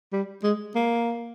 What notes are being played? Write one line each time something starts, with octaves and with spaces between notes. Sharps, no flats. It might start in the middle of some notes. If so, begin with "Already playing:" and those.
G3
G#3
A#3